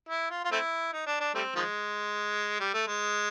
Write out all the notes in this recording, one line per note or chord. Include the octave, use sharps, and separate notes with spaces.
E4
F4
F4
A3 C4 E4
D#4
D4
D4
G3 A3 C4
D#3 F3 G#3
G3
A3
G#3